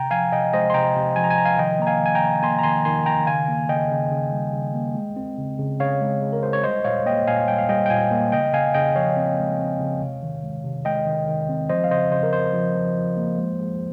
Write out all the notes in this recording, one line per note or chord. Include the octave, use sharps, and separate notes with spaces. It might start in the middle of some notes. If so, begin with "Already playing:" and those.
Already playing: C3 G5 A#5
F3 F5 G#5
C3 D#5 G5
G#3 C5 D#5
C6
C3 G5 A#5
C3
F3 G#5
A#5
G#5
C3 A#5
F5 G#5
D#3 D#5 G5
A#3 A#5
F5 G#5
D#3
G#5
G5 A#5
D#3
A#3 G#5 C6
A#5
D#3 G#5 C6
D#3 G#5 C6
D#3 G5 A#5
C#3 F5 G#5
A#3
C#3 D#5 G5
C#3
C#3
G3
C#3
A#3
G#3
C4
C#3
C#3
C#3 C#5 F5
G#3
G#3
A#4
G#3 C5
C#5
G3 C5 D#5
A#2 C#5 F5
A#3 D#5 G5
A#2 F5 G#5
G3 G5
F5
G3 D#5 G5
G5
A#2 F5 G#5
A#3
C#3 D#5 G5
C#3 F5 G#5
C#3 D#5 G5
F3 C#5 F5
C4
G#3
C4
C#3
C3
D#3
G#3
C3
G#3 D#5 G5
D#3
D#3
C4
F3 C5 D#5
F5
C#3 C5 D#5
C#3 C5
A#4
C#3 C5
F3
F3
F3
A#3
G#3
G#3